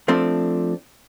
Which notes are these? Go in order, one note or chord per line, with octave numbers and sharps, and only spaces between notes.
F3 A3 C4 D4